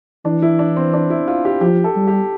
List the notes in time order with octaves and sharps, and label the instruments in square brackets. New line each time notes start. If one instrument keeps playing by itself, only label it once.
[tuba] E3 [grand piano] D4
[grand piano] E4
D4
C4
D4
E4
F4
G4
[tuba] F3 [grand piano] G4
[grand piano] A4
[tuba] G3
[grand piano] G4